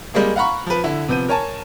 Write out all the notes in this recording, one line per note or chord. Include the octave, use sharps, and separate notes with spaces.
G3 G#3 A#3 G#4
F5 F#5 A#5 B5 C#6
F3 B4
D3 E4
C3 F3 B3 G6 D#7
A#4 C#5 G#5 A5